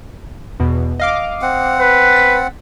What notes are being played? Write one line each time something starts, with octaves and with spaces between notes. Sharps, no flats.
E2 B2
D#5 F5 D6
C4 F#5
B4
A6 B6